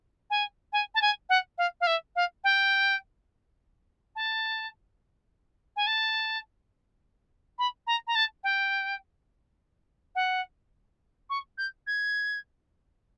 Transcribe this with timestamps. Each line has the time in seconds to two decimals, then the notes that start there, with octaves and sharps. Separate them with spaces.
0.30 G#5
0.73 G#5
0.95 A5
1.02 G#5
1.29 F#5
1.58 F5
1.81 F5
1.87 E5
2.16 F5
2.44 G5
4.16 A5
5.76 G#5
5.87 A5
7.58 B5
7.87 A#5
8.07 A#5
8.15 A5
8.44 G5
10.15 F#5
11.30 C#6
11.58 G6
11.87 G#6